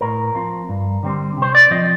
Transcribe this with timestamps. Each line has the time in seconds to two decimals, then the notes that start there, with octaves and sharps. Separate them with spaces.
0.01 A2 A#4
0.35 F3 C4
0.69 G2
1.03 D3 G3 C4
1.37 C3 C5
1.55 D5
1.71 F3 C4 D#5